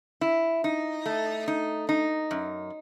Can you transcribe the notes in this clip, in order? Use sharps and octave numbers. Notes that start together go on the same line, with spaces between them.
E4
D#4
A3
D#4
D#4
F#2